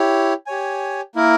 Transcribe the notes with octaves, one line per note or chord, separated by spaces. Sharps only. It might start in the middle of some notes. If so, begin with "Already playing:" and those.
Already playing: E4 G4 C#5
G4 C#5 G#5
A#3 E4 A#4